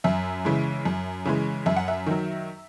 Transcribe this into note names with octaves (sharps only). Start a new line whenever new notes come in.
F#2 E5
C#3 E3 G#3
F#2
C#3 E3 G#3
F#2 E5
F#5
E5
D#3 F#3